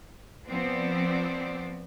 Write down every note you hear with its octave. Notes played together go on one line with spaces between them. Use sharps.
F3 B3 C4 D5